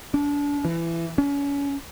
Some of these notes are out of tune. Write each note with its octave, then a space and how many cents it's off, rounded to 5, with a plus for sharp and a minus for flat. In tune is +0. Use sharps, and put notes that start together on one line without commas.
D4 -30
E3 +20
C#4 +30